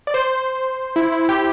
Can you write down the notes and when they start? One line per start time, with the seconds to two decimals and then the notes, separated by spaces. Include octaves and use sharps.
0.07 D5
0.14 C5
0.96 E4
1.12 E4
1.29 G4